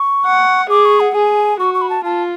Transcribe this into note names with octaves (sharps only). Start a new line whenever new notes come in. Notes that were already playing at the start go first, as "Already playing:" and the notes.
Already playing: C#6
F#5
G#4 D6
C#6
F#5
G#4 G#5
F#4 C#6
C#6
B5
A5
F4 A5